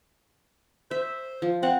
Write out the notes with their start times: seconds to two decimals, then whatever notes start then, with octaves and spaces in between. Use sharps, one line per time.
0.91 C5 E5
1.42 F3
1.63 C4 F#5